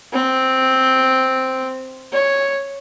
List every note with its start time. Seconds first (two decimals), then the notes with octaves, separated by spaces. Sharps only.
0.13 C4
2.12 C#5